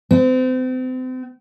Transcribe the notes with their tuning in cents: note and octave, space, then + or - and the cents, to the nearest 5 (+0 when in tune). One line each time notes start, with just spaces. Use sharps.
C4 -35